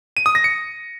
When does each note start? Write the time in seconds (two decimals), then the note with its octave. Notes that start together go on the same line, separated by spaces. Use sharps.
0.17 D#7
0.26 D#6
0.35 A#6
0.44 C#7